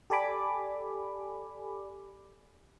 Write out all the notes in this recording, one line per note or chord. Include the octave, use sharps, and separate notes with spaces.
G4 A4 D5 G#5 B5 D6